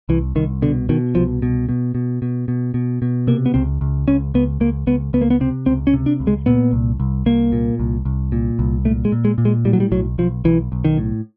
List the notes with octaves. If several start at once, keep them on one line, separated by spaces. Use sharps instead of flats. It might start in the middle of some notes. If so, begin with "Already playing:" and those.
C2 E3
C2 D#3
B2 D3
B2 D#3
C2 F3
B2
B2
B2
B2
B2
B2
B2
C3 A#3
B3
C#2 C4
C#2
C#2 C#4
C#2 B3
C#2 A#3
C#2 B3
C#2 B3
A#3
B3
C3 C4
C#2 C4
C#4
C3
D4
C#2
G#3
A#2 B3
C2
C2
C2 A#3
A#2
C2
C2
A#2
C2
A#2 A3
G#3
A#2
G#3
A#2
G#3
A2 G3
F#3
G3
B1 F#3
B1 F3
B1 E3
B1
D#3
A2